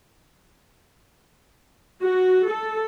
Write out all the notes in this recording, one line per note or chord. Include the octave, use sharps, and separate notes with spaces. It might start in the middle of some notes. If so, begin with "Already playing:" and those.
F#4
A4